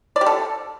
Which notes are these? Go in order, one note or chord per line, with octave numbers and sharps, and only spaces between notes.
D5
G4
A4